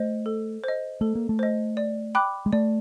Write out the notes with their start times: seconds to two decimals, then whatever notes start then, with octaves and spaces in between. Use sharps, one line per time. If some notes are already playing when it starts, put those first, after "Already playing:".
Already playing: A3 C5 D#5
0.26 A4
0.64 C5 D#5
1.01 A3 A4
1.15 A#3
1.29 A3
1.39 C5 D#5
1.77 D5
2.15 G5 B5 D6 F#6
2.46 G#3
2.53 A3 D5